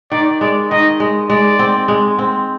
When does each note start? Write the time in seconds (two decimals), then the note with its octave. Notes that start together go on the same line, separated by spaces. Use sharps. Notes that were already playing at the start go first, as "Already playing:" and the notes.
0.12 D#3 D5
0.41 G#3 D5
0.71 D#3 D#5
1.00 G#3
1.30 G#3 D5
1.59 C4
1.88 G#3
2.19 C4